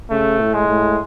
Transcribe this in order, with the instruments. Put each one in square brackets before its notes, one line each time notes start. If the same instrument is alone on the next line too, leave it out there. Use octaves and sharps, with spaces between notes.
[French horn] C#3 [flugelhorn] A3
[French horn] A2
[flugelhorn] G#3
[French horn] A2